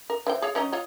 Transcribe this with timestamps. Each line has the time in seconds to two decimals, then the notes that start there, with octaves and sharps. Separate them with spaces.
0.10 A#4
0.27 E3 C5 G5
0.42 G#4 C#5 F5
0.55 F#3 C#4 D#4
0.72 F4 C#5 D#5